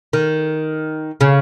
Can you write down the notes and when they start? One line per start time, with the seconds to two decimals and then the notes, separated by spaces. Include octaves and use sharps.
0.13 D#3
1.21 C#3